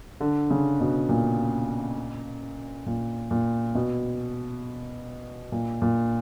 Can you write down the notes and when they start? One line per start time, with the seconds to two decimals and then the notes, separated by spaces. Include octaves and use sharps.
0.21 D3
0.51 C#3
0.80 B2
1.09 A#2
2.86 A#2
3.31 A#2
3.75 B2
5.52 A#2
5.82 A#2